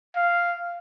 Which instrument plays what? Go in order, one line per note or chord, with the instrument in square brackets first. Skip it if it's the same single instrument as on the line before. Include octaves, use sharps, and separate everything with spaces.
[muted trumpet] F5